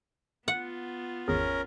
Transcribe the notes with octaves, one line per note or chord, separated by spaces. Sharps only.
B3 F4 F#5
G#1 E2 C#4 G#4 A#4